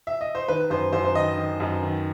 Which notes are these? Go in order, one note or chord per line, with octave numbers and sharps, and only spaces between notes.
E5
D#5
C5
D#3 B4
F#2 C5
F#2 C5
C5
D#3 D#5
D#3
F#2
D#3